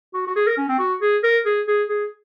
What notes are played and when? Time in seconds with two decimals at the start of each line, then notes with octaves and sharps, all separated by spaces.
0.14 F#4
0.27 F#4
0.36 G#4
0.47 A#4
0.57 C#4
0.69 C4
0.79 F#4
1.01 G#4
1.23 A#4
1.45 G#4
1.67 G#4
1.89 G#4